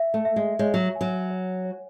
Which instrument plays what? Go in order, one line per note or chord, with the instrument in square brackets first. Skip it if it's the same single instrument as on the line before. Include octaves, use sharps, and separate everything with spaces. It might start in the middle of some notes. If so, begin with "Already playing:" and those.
Already playing: [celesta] E5
[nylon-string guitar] A3
[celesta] E5
[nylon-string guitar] G#3
[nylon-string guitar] G#3 [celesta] C#5
[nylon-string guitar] F#3
[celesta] G#5
[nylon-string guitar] F#3
[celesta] C#5
C#5